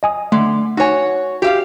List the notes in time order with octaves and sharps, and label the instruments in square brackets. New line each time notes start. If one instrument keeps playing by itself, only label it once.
[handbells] D#5 G#5 D#6
[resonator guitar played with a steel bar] D3 [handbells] A3
[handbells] D#4 G#5 [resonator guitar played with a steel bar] F#4 C#5
[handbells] F#4 [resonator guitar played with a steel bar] G4 E5 F5